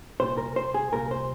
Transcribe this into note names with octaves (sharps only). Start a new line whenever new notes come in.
C2 A#2 C5
A#4
C5
G#4
C2 A#2 A#4
C5